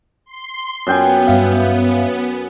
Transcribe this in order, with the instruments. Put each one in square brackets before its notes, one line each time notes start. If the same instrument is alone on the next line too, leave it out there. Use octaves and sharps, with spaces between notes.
[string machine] C6
[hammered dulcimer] F#2 G5 G#5 [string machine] B3
[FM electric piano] G2 E5 F5